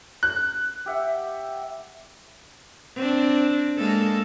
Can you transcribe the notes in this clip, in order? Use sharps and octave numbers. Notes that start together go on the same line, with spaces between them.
F#6
G4 E5 F#5
C4 D4
G#3 A#3 A4